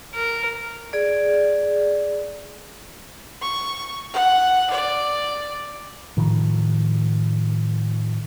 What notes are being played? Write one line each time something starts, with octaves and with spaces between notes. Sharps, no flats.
A#4
G#4 D5
C#6
F#5
D5
A2 D#3 F3